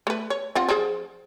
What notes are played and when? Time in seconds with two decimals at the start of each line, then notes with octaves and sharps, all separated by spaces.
0.07 A3 B4
0.30 C#5
0.55 C4 F4 F#5
0.69 F3 G#4